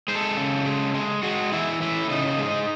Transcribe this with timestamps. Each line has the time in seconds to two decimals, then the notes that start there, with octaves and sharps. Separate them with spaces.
0.08 G#3 C5
0.15 A4
0.37 C#3
0.65 G#3
0.94 G#3
1.23 G#3 F#4
1.52 E3 E4
1.81 A2 E4
2.10 C#3 D#4
2.39 G#3